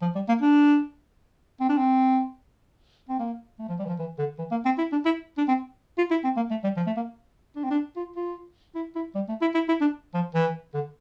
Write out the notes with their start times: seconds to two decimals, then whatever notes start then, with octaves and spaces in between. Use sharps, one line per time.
0.02 F3
0.15 G3
0.28 A#3
0.41 D4
1.60 C4
1.69 D4
1.77 C4
3.09 C4
3.19 A#3
3.59 A3
3.69 F3
3.79 G3
3.85 E3
3.88 F3
3.99 E3
4.19 D3
4.39 E3
4.51 A#3
4.65 C4
4.78 E4
4.92 D4
5.05 E4
5.38 D4
5.48 C4
5.98 F4
6.11 E4
6.24 C4
6.37 A#3
6.50 A3
6.64 G3
6.77 F3
6.87 A3
6.97 A#3
7.56 D4
7.64 C4
7.70 D4
7.96 F4
8.16 F4
8.75 E4
8.95 E4
9.15 G3
9.28 A3
9.41 E4
9.54 E4
9.68 E4
9.81 D4
10.14 F3
10.34 E3
10.74 D3